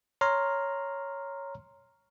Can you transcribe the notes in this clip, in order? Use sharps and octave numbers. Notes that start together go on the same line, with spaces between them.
C#5 A#5 C6 F6